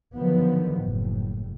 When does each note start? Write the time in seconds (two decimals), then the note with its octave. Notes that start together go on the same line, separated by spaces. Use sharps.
0.16 D3 D#3 F3 F#3 B3
0.81 F#1 A2